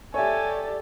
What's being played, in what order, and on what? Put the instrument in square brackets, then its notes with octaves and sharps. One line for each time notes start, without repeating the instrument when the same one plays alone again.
[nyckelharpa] G4 A4 [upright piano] C#5 E5 [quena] D5 [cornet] G#5